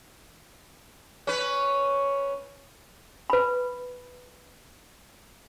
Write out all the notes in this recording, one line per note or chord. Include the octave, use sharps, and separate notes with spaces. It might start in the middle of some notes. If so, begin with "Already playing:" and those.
C#4 B4
B4 B5